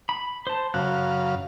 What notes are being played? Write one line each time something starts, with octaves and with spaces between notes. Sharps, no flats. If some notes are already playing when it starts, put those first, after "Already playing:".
B5
C5 A5
F#2 C#3 F5 F#6